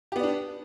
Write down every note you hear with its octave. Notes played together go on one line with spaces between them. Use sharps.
B3 D4 G4 D5